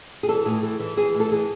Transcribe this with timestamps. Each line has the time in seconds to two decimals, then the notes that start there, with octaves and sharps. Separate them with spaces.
0.23 G#4
0.28 E3 A4
0.46 A2 G#4
0.63 E3 A4
0.80 E3
0.97 E3 G#4
1.14 A2
1.20 A4
1.31 E3 G#4